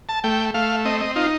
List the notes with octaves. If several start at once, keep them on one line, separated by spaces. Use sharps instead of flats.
A5
A3 G5
A3 F5
C4 D#5
D#5
D#4 F4